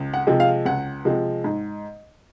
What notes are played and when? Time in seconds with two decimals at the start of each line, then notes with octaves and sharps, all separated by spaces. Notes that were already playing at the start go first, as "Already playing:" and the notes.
Already playing: C#2
0.14 F#5
0.27 C3 F3 G#3
0.40 F5
0.65 C#2 F#5
1.05 C3 F3 G#3
1.44 G#2